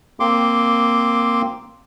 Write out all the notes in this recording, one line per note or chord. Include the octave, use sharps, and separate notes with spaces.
A#3 C4 C6 D6